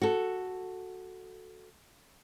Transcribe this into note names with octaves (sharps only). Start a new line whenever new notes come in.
F#4 A4